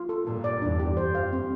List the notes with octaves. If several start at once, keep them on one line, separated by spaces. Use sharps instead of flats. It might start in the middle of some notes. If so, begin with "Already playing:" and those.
Already playing: F4
A4
G2 A#2 A4
D5
E2 G2 D4
G4
F2 C5
F5
C4